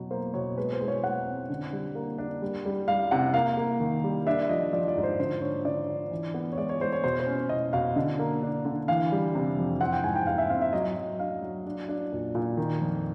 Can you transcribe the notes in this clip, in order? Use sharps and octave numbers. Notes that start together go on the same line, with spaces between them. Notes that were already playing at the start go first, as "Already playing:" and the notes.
Already playing: B2 F#3
A#3 C5
B2 C#5
G#3 B4
C5
G#3
C#5
G#3 F#5
C4
D3
G3
A#3
D4
G3
G3
G3 F5
C3 F#5
A#3 F5
A#3
D#3
G3
D4 E5
F3 D#5
F3 D5
D5
G#2
C5
D3 C5
D4 C#5
D3 D5
D4
E3
B3
C#5
G#3 D5
C#5
G#3 C5
C#5
B2 C5
C5
C#4
B2 D#5
B2 F5
D3
A#3
D4
D3
E3 F5
G3
C3
F2
C4 F#5
G5
G#2 G#5
G5
G#2 F5
E5
C4 F5
E5
F#3 D#5
F#3
D4 F5
F#3
D4
D4
A#2
A#2
D#3
F2